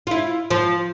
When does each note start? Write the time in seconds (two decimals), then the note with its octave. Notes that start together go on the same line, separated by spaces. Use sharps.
0.07 E4 F4
0.51 F3